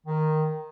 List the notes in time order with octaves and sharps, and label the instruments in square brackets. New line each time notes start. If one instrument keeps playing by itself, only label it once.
[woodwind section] D#3